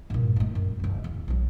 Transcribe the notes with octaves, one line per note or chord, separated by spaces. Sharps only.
G2 A#2
A3 D#4
F#2
D1 C#3
E2
B1 F#3